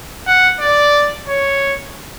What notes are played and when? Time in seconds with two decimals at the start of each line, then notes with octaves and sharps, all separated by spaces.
0.27 F#5
0.60 D5
1.28 C#5